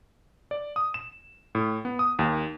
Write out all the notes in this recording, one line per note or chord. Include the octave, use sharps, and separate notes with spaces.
D5
D#6
E7
A2
B3
D#6
D#2